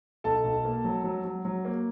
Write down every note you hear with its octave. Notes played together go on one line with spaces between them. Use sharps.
B1 A4 A5
B1
A#3
F#3
F#3
F#3
F#3
A#3